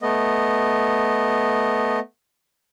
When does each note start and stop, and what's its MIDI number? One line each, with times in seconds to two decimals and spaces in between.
0.02 1.99 57
0.02 1.99 59
0.02 1.99 75